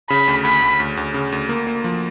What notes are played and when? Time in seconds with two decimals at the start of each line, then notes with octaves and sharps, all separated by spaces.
0.10 C#3 B5
0.28 D2
0.45 D2 B5
0.62 D2
0.80 D2
0.97 D2
1.14 C#3
1.32 D2
1.49 A#3
1.67 A#3
1.84 F3